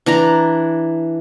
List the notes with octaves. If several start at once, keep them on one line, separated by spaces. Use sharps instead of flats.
E3 D4 A#5